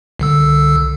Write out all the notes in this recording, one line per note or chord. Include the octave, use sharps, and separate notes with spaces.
C2 D3 E6